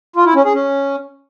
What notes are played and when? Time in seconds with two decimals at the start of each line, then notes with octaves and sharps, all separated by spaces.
0.16 F4
0.26 E4
0.35 C#4
0.45 G#4
0.54 C#4